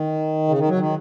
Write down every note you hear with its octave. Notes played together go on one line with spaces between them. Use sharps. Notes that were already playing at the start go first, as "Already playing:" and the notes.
Already playing: D#3
C#3
D#3
F#3
D#3